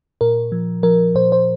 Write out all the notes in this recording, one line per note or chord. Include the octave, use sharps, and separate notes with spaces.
A#2 A#4
F3
F3 A#4
A#2 C5
C5